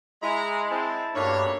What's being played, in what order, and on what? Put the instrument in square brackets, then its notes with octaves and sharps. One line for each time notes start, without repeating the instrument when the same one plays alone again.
[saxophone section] G#3 [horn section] E4 A#5
[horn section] C4 [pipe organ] E4 A5
[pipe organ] G2 D4 B5 [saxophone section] B2 A3 A#3 [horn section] C#5